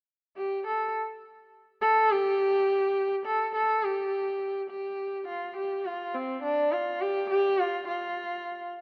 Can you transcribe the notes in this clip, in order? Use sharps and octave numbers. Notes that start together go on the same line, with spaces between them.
G4
A4
A4
G4
A4
A4
G4
G4
F4
G4
F4
C4
D4
F4
G4
G4
F4
F4